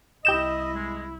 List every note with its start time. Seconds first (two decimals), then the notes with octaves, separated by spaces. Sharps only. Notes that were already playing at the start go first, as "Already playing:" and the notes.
0.25 C2 E4 G4 D#5 G6 E7
0.75 G#3